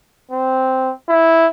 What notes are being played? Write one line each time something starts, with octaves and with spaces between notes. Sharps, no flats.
C4
E4